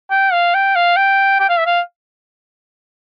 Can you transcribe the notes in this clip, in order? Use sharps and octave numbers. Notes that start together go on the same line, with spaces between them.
G5
F5
G5
F5
G5
G5
F5
E5
F5